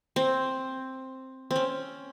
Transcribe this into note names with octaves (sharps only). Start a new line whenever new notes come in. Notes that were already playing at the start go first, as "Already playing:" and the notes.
C4
C4
C#4